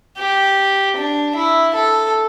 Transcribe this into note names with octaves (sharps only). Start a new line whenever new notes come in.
G4
D4
E4
A4